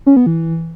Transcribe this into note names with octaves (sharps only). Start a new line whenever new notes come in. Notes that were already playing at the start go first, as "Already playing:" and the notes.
C#4
B3
E3